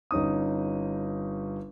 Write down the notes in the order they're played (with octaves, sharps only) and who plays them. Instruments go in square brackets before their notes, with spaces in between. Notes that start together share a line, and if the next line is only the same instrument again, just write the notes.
[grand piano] G1 C#4 D#4 D#6